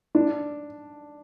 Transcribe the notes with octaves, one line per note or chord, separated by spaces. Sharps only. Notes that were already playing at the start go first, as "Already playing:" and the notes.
D4